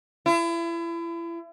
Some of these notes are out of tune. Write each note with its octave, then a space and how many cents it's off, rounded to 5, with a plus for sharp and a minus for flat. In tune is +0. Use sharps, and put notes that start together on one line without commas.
E4 +35